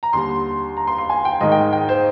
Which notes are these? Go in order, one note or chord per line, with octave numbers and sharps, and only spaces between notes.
A#5
D#2 D3 G3 C6
A#5
C6
C6
G#5
G5
G#2 D#3 G#3 D#5
G5
G5
C5